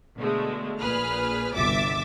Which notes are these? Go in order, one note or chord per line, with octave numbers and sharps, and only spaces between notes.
B2 D3 G#3 A3
A#1 A#2 G#4 B4 F6
G1 C2 B2 E5 D6 A6